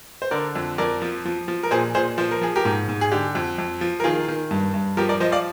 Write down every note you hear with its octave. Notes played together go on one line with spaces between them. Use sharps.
C5
D3 A#4 D5
F2
F2 A#4 D5
F3
F3
F3
A#4
A#2 G#4 C5
A#2 G#4 C5
F3 C5
A#4
F3 G#4
G4 A#4
G#2
G#2
G#4
D3 G4
F2
F2
F3
A#4
D#3 F4 G#4
D#3
G2
G2
F3 G4 A#4
A#4 D5
F3 C5 D#5
D5 F5